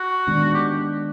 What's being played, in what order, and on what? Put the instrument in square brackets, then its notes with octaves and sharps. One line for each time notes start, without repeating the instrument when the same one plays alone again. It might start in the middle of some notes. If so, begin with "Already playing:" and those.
Already playing: [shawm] F#4
[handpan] D#3 G#3 B3 D4
[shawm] G4